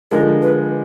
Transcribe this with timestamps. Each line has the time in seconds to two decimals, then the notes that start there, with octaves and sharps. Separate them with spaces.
0.11 D3 F3 G#3 A#4
0.42 B4